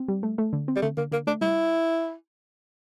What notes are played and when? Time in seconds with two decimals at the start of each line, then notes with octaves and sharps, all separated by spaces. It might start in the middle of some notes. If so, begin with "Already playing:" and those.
Already playing: C4
0.08 G3
0.23 A3
0.38 A3
0.53 D3
0.68 C4
0.76 G3
0.82 D3 A3
0.97 D3 A#3
1.12 D3 A#3
1.27 A3 D4
1.41 G3 E4